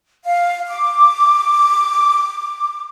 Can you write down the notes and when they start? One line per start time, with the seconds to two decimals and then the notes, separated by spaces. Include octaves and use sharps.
0.24 F5
0.67 D6